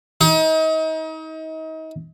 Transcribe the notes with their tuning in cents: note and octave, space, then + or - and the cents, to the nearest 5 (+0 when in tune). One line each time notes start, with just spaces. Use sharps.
D#4 +35